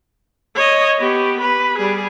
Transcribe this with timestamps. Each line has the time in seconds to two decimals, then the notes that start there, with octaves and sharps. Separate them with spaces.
0.55 C#5 D#5
0.99 B3 G4
1.41 B4
1.78 G3 G#4